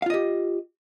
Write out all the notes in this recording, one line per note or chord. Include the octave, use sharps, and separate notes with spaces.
F4 G4 D#5 F5